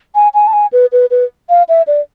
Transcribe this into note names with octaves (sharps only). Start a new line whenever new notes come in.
G#5
G#5
A5
G#5
B4
B4
B4
F5
E5
D5